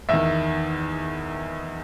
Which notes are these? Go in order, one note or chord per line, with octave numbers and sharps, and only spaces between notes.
E2 D#3 E5